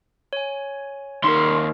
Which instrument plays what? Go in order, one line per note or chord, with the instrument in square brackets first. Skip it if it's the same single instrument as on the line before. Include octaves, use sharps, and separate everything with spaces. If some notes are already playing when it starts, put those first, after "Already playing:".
[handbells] C#5 G#5
[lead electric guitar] D#2 C6 [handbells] D#4 A#4